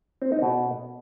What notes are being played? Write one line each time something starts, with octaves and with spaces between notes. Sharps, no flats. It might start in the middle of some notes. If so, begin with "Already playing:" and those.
C4
D#4
B2